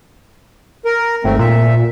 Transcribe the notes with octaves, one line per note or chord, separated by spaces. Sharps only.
A#4
G#1 A3 C4
A#2 E5